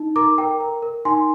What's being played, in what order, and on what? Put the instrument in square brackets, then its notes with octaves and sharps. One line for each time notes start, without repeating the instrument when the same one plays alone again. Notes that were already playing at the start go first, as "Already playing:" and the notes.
Already playing: [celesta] D#4
A#4 A#5 D6
A#4 G5 A#5
A#4
A#4
D#4 G#5 C6